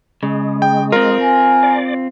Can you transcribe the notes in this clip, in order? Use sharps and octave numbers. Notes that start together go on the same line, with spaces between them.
C#3 G#3
G5
C4 F4 A#4
G#5
D5